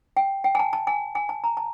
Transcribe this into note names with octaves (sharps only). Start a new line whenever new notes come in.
G5
G5
G#5
A5
A5
G#5
G#5
A5
A#5
A5